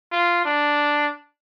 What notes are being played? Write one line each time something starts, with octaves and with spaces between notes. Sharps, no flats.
F4
D4